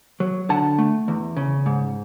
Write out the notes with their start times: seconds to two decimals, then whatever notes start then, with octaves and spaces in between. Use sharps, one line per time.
0.20 F#3
0.49 D3 F#5 A5
0.79 A3
1.08 E2
1.37 C#3
1.66 G#2